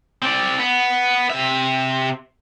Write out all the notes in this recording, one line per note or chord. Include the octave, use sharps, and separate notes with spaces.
C4 D5
B3
C3 E5